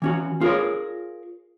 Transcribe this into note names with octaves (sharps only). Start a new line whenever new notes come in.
E3 C#4 F#4
F4 G#4 A#4 C#5